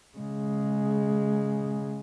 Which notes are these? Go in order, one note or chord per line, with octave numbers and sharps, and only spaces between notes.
C#3 G#3